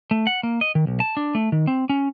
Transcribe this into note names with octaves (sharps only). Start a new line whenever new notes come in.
A3
F#5
A#3
D#5
D#3
B1
A5
D4
A3
D#3
C4
C#4